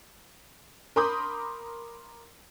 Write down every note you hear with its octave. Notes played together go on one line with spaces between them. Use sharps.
A#4 B5 C6 D6 D#6 G6